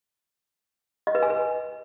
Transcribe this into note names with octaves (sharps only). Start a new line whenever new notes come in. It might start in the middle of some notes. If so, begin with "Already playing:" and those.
D#5
B4
G#5
B4